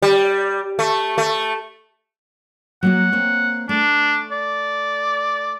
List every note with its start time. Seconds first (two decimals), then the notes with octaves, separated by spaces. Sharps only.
0.02 G3
0.79 A3
1.18 A3
2.83 F#3 A#3 F#4 F#5
3.12 A#3 C4 C#5
3.69 A3 D4
4.31 D5